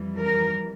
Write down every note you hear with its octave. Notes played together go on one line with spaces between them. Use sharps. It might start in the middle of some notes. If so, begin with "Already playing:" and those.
Already playing: F2 E3 G3
A#4